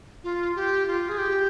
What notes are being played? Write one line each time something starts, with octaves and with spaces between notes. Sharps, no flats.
F4
G4
F4
G#4
G4